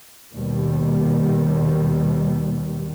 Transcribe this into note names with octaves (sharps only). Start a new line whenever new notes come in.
D#2 B2 D#3 G3